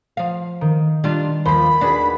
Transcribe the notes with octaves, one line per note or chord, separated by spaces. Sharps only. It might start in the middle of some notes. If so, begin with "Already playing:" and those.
F3 F5
D#3
G3 D4 F4
D#2 F3 C5 B5
D4 F#4 G#4 B4